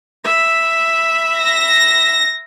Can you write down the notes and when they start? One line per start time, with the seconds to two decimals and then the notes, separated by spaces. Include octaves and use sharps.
0.24 E5 B5
1.40 A#6